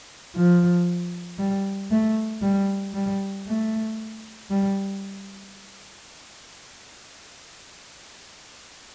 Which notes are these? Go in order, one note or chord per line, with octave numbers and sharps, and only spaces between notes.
F3
G3
A3
G3
G3
A3
G3